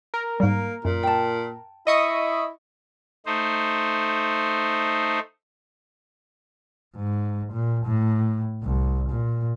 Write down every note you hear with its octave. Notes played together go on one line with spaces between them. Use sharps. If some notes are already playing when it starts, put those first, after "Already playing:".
A#4
G#2 G3 A#3
F#2 A#2
G5 A5
E4 D#5 C#6 D#6
A3 D#4 C5
G#2
A#2
A2
C2
A#2